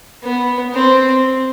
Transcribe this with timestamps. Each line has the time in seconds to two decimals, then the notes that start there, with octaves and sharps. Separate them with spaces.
0.24 B3
0.75 C4